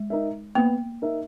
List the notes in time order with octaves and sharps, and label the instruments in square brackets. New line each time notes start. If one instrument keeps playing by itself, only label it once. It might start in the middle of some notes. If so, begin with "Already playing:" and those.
Already playing: [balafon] G#3
[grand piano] D#4 A#4 E5
[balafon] A#3 [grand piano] B3
[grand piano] D#4 A#4 E5